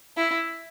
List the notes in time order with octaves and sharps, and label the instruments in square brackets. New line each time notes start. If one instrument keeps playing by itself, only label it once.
[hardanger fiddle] E4